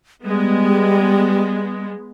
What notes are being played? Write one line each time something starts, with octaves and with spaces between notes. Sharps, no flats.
G3 G#3 B3